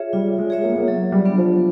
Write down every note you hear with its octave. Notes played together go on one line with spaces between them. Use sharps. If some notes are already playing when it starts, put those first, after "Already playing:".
Already playing: F4 G#4 C#5 E5
G3 F4
G#3
G#4 C#5 E5
A#3
B3
A#3
F#3
G3
B3 D4
F3